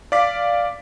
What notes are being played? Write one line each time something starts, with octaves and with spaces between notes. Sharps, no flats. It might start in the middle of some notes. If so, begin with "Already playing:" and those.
D5 F5 D6 B6